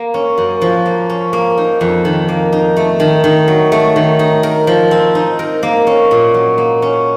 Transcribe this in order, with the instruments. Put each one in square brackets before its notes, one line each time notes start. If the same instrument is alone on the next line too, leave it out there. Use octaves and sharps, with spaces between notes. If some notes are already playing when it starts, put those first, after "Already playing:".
Already playing: [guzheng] A#3
C#4
F#2
F3
A#3
C#4
A#3
D#4
F2
D#3
A#3
D#4
A3
D#3
D#3
F#3
A3
D#3
D#4
A#4
F3
C4
D#4
A#4
A#3
C#4
A#2
F#3
A#3
C#4